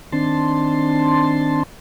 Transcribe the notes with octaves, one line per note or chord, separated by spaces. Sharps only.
D#3 C4 D4 A5 C6